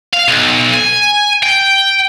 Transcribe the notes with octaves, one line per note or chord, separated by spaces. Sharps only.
F5
B1
G#5
G5